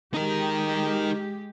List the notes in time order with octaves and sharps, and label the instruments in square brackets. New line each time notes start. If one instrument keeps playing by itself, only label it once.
[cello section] G#3 G4 [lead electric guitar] D#4 A#4